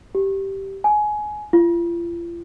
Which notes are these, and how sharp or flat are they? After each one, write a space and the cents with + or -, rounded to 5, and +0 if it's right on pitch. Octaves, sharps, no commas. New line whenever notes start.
G4 -10
G#5 +20
F4 -40